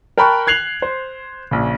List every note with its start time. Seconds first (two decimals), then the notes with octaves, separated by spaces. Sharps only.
0.18 A#4 G5 A5 B5 C#6 F#6
0.47 F#6 G#6 C7 F7 F#7
0.82 C5
1.51 A#1 C#3